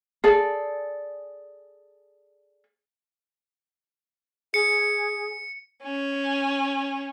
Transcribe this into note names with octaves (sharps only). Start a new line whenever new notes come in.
G#4 A4 D5
G#4 C#7
C#4